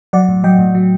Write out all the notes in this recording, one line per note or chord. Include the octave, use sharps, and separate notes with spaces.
F#3 D5 F#5
A2
F#3 D#5 G5
A2
F#3